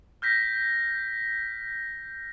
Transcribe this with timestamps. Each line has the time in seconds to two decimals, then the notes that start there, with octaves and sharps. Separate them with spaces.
0.22 F6 G6 A#6 B6